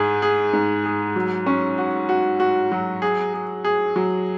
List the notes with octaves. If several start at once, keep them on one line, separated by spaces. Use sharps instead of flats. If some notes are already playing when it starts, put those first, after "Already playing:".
Already playing: G#2 G#4
G#4
G#2
G#4
F#3
C#4
F#4
F#4
F#4
F#3
G#4
G#4
G#4
F#3